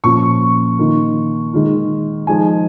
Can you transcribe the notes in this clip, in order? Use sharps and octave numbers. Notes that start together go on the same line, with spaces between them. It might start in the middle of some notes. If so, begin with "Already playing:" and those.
A#2 F3 C#4 F4 C#6
D#3 A#3 F4
D#3 G#3 F4
F3 G#3 D#4 G#5